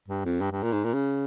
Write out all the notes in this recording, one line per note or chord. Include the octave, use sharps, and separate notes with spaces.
G2
F2
G2
G2
A#2
G#2
A#2
C#3